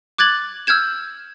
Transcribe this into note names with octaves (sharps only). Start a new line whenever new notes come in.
D6 F#6 G#6 A6 F#7
E6 F6 G6 G#6 E7